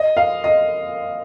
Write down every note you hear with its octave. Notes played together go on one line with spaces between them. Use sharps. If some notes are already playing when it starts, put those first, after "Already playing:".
Already playing: D#5
F5
D#5